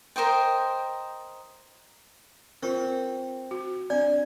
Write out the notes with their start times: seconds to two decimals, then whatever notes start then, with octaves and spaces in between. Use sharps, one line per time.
0.16 A#4 C5 D#5 G5
2.63 C4 F4 A#4
3.51 F#4
3.90 C4 D4 D5 G#5